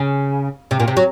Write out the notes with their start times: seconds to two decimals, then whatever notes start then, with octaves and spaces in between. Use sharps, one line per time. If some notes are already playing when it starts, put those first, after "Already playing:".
Already playing: C#3
0.71 C3
0.80 A#2
0.88 C3
0.97 F#3